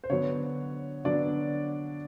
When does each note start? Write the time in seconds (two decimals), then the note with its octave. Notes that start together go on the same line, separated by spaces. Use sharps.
0.04 C5
0.10 D3 F#3 B3 D4 C#5
1.04 D3 F#3 B3 D4 D5